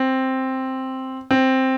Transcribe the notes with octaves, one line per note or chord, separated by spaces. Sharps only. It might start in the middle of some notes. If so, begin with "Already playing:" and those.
Already playing: C4
C4